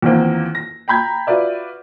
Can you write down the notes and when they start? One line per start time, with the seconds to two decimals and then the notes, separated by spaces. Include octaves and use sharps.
0.02 E2 D#3 F3 A#3 C4
0.55 A#6
0.88 G5 A#5 B5 G6 G#6
1.27 F4 F#4 B4 D5 E5